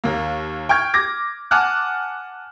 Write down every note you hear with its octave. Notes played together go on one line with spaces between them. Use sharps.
D#2 A#3
G5 C#6 F6 G#6
D6 G#6 A#6
F#5 G#5 A5 D6 F6 F#6